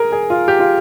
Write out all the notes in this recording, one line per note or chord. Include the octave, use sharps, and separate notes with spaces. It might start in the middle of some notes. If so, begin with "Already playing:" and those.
Already playing: G#4 A#4
G#4
F4
G4
F4